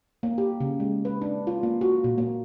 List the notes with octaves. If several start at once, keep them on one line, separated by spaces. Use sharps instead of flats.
A#3
G4
C#3
G#3
B4
D4
F4
A#3
F#4
A#2
A#3